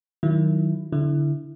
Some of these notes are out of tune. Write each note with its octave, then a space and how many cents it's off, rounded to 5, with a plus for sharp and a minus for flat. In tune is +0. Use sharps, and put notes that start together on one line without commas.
D#3 +0 F#3 +0 E4 +10
D3 -20 E4 +0